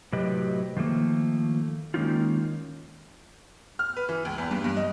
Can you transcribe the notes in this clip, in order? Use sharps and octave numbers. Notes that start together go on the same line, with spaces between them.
A2 C3 F#3 G4 B4 D#5
D#3 F3 A3 A#3
D#3 G#3 A#3 C#4 D#4 F4
F6
B4
E3
C#2
E2
G2
G2
D#5